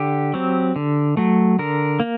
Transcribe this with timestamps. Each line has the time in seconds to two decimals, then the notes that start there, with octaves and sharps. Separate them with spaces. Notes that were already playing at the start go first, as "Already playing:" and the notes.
Already playing: D3 G4
0.34 F#3 C4
0.76 D3
1.17 F#3 A3
1.59 D3 A#4
2.00 A#3